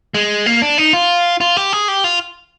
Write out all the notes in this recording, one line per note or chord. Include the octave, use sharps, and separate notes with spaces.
G#3
A#3
D4
D#4
F4
F4
G4
G#4
G4
F4